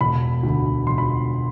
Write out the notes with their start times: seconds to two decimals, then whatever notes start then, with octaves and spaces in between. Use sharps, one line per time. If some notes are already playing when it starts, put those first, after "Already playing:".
0.01 E1 B5
0.43 D2 D3
0.86 E1 C6
0.98 B5